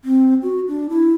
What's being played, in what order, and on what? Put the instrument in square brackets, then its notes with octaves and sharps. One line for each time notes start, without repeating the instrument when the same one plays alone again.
[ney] C4
F#4
D4
E4